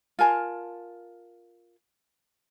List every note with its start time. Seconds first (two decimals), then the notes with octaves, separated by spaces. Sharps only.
0.19 F4 A#4 G#5 A5